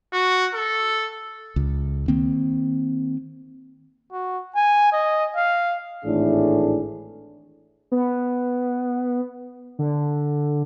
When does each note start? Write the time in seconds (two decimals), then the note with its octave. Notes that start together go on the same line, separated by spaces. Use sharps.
0.13 F#4
0.55 A4
1.56 C#2
2.08 D#3 A#3 C4
4.12 F#4
4.56 G#5
4.93 D#5
5.36 F5
6.05 G#1 A2 E3 A3 D4 G#4
7.92 B3
9.79 D3